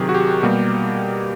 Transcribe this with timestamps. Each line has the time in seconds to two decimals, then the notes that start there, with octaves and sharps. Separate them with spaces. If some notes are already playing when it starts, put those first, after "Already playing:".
Already playing: C3 D#3 F#3 G4 G#4
0.09 F#4
0.14 G4
0.43 B2 G3 A#3